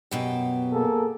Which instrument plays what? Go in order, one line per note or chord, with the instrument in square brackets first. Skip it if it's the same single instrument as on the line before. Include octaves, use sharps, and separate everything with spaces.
[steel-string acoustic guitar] F#2 B2 G4
[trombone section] A#3 G#4 A4